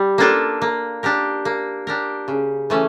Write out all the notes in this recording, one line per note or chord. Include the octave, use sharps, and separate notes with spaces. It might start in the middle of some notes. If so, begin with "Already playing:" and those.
Already playing: G3
A#3 D4 F4 A4
A#3
D4 G4 A#4
A#3
D4 G4 A#4
C#3
E3 A3 C#4